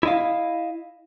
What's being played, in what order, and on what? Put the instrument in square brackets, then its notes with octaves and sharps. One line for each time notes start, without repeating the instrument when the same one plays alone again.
[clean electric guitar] E4 D#5 F5